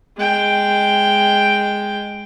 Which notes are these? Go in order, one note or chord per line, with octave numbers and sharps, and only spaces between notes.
G#3 G5